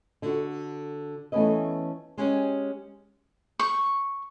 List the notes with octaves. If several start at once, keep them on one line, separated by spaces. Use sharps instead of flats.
D3 F#4
E3 A3 B3 C#4 B4 D#5
G#3 C#4 G4
C#6